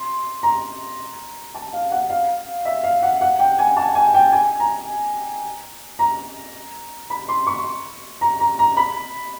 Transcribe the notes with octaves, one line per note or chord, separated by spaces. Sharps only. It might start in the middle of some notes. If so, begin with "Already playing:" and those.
Already playing: C6
A#5
A5
F5
F#5
F5
E5
F5
F#5
F#5
G5
G#5
A5
G#5
G5
G#5
A#5
A#5
B5
C6
C#6
A#5
A#5
A#5
B5